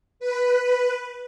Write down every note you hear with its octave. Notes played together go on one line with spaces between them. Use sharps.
B4